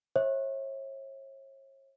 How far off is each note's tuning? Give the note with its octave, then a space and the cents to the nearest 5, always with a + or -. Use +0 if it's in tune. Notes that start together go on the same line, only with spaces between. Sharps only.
C#5 -40 E5 -20